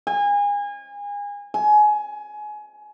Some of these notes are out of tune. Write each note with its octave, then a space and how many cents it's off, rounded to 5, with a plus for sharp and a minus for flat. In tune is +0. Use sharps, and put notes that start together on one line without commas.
G#5 -30
G#5 +25